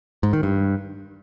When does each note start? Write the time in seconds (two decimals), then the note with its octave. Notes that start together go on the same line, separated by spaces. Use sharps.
0.23 G#2
0.33 D#3
0.43 G2